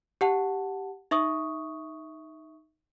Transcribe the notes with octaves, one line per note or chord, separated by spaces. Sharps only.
G4 F#5 A5
D#4 E5 C#6 D#6